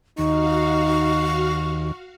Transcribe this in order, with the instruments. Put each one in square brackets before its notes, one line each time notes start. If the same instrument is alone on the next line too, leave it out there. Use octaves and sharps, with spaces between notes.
[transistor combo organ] D#2 [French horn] D#4 [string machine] F#4 F5 [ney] C#6